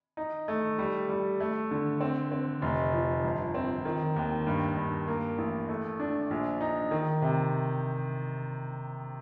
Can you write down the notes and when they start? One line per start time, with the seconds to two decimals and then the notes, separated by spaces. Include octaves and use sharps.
0.17 D#4
0.48 A3
0.78 G3
1.09 G3
1.40 A3
1.71 D3
2.01 C4
2.32 C4
2.62 F1
2.94 F3
3.24 G1
3.54 C4
3.85 D#3
4.16 D#2
4.47 G2
4.77 G2
5.08 A#3
5.38 A1
5.69 A3
6.00 D4
6.31 A#1
6.61 D#4
6.91 D#3
7.22 C3